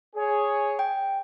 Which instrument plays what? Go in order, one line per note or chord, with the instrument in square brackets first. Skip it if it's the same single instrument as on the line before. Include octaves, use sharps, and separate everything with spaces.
[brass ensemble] G#4 C#5
[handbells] G5